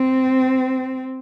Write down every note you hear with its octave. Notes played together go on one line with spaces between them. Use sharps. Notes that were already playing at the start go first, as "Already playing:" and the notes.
Already playing: C4